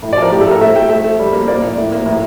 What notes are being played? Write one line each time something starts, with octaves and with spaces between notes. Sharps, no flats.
A2
D5
F3 A#4
A2 G4
A4
A2 A#4
A3 E5
A3 G5
A3 E5
A3
G3
A#3
A#3 D5
A#2
A2
A#3
A2 A#4